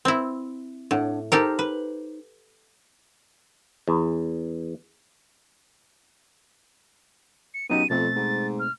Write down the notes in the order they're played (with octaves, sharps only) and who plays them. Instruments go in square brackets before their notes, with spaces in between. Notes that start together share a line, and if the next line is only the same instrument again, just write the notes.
[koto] C4 E4
[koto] A2 [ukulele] D4 C#5 F#5
[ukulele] D#4 C5 [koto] G4 A4 A#4
[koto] B4
[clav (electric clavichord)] E2
[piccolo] C#7
[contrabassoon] F#2 [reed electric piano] B3 D#4 G4 [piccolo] D#7
[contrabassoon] F2 [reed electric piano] B2 A3 C4 [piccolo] A6
[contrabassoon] G#2
[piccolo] F6